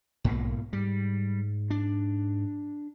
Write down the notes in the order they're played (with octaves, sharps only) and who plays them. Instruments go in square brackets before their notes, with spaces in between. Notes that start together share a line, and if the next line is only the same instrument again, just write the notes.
[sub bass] B1 [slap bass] G#2 B2 A#3
[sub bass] G#2 [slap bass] G3
[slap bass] D4